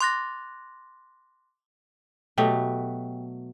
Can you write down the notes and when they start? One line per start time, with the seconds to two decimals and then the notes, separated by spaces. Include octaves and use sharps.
0.01 C6 D6 F#6 A6 A#6
2.38 B2 F#3 A3 G4